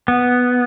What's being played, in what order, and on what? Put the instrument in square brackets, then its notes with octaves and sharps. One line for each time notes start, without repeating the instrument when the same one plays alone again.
[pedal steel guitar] B3